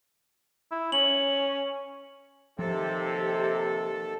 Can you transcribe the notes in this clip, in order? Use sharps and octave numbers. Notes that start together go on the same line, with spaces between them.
E4
C#4 F#7
D#2 C3 F3 A4